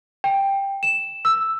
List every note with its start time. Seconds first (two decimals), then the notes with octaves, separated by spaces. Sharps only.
0.24 G5
0.83 E7
1.25 E6